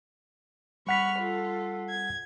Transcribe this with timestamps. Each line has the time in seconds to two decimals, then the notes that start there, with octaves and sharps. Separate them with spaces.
0.87 G3 F#5 B5 C#6 F6 B6
1.20 F4 A4
1.89 G#6